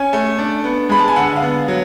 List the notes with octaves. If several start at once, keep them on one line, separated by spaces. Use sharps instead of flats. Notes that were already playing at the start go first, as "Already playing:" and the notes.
Already playing: C#4 G#5
A3
D4
B3
G#3 B5
A5
G#5
D3 F#5
F5
B3
F#3